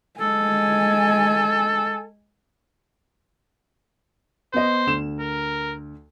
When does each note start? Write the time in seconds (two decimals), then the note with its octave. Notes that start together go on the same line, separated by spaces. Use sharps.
0.21 G#3 A4 G#5
4.54 B3 C5 D#5
4.87 D2 E7
5.20 A#4